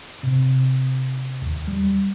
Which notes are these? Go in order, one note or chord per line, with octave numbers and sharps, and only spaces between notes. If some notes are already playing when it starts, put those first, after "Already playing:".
C3
D#2
G3